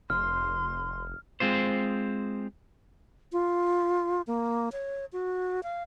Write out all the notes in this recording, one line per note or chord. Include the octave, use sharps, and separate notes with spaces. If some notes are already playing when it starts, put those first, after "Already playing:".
F1 C6 F6
G#3 C4 F4 C5
F4
A#3
C#5
F#4
F5